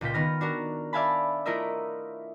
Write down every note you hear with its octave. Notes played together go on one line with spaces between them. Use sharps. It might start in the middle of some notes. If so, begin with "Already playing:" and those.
C#2 A#2 F4 G5 B6
D#3 B3 F6 A#6
D4 F#4 A#4
D5 E5 F5 G#5 A5 B5
A3 E4 F4 A#4 D#5 E5